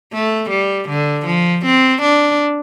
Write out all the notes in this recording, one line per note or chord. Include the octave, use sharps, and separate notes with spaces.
A3
G3
D3
F3
C4
D4